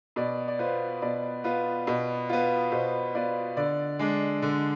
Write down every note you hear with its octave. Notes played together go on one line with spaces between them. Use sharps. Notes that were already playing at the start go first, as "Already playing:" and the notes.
B2 D5
D5
B3 F4 C5
B2 D5
B3 F4
B2
B3 F4
B2 C5
B3 F4 D5
D3 D5
G#3 D4
D3